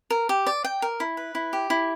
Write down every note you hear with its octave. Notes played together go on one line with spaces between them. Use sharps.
A#4
G4
D5
G5
A#4
E4
B4
E4
G4
E4